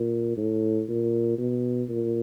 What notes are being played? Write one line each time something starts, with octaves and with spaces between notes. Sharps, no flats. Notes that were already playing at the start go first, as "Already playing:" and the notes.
Already playing: A#2
A2
A#2
B2
A#2